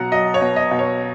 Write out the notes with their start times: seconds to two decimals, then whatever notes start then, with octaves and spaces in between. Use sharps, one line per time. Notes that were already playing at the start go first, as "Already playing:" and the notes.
Already playing: B2 F#3 F#5 A#5
0.12 F#3 D#5
0.34 C#5
0.41 B2
0.56 D#5
0.71 B2
0.79 C#5